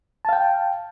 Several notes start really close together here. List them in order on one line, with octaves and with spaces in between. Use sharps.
A5 F5 G5